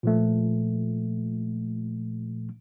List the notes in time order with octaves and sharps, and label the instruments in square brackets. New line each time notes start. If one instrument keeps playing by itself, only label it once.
[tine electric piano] A#2 F3 A3